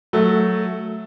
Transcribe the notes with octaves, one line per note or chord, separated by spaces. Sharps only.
F#3 A3